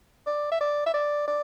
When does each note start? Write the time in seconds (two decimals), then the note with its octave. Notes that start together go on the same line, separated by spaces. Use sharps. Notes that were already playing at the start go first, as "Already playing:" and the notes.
0.27 D5
0.52 E5
0.61 D5
0.86 E5
0.94 D5
1.27 D5